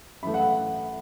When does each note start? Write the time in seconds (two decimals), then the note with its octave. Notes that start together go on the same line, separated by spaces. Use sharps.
0.23 F#2 E3 A3 B5
0.34 F#5